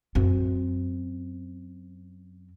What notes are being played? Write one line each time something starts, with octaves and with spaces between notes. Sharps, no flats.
F#2 C4